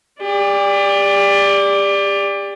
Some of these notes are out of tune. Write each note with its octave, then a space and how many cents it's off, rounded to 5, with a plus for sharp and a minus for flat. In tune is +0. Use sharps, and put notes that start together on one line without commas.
G4 +40 D5 +0